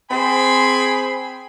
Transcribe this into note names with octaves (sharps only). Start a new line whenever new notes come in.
C4 G#4 C5 G#5 B5